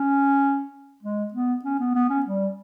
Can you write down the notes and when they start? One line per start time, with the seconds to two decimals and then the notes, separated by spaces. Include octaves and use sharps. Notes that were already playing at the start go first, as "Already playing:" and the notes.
Already playing: C#4
1.03 G#3
1.34 B3
1.65 C#4
1.80 B3
1.95 B3
2.10 C#4
2.26 G3